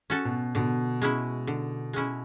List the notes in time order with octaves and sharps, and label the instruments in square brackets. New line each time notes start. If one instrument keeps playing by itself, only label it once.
[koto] C#4 F#4 A4
[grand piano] B2
[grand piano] B2 [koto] D3
[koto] G#3 C#4 E4
D3
G#3 C#4 E4